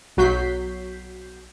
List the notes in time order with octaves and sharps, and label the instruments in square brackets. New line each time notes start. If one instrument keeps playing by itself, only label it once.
[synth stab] B1 F#3 F#4 G6 B6 C7